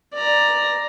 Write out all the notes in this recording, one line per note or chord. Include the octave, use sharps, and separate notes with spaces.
D5 A#5